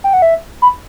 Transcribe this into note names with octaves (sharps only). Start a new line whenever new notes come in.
G5
F#5
E5
B5